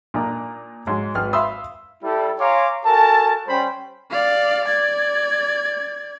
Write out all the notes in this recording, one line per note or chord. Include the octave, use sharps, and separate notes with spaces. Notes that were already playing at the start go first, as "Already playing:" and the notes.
A#2 A#3 D4 D#4 A#5
G#2 F#3
G#1 B4 F6
E5 F5 B5 C6 D#6 E6
G3 E4 A4
C#5 F5 G#5 A#5 C6 D6
F#4 A4 A#4 G#5 A5
G3 C#4 C5 G5 B5
D5 F5
D5 G#6